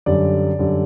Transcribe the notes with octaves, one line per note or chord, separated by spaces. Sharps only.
F#2 D3 G3 D5
F#2 D3 G3